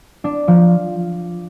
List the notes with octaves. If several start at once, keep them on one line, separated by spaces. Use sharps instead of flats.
D4
F3